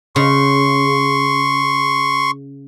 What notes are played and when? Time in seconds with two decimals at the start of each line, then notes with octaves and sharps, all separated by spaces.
0.16 C#3 C6 C#6